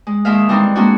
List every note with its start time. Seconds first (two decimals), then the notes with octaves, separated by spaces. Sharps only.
0.07 G#3
0.25 D#2 G#3 E5 F5
0.49 E3 G3 G#3 C4 D#4
0.75 G#3 A#3 C4 D4 F#4